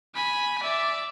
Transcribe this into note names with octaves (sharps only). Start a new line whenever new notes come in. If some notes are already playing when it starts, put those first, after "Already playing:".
G#5 B5
D5 E5